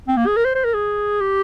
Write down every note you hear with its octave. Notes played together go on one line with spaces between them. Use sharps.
C4
A#3
G#4
A#4
C5
C5
A#4
G#4
G4